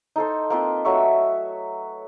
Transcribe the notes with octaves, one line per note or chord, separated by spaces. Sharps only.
D#4 A4 C5
A#3 C4 F4 B4
F#3 A3 E5 C#6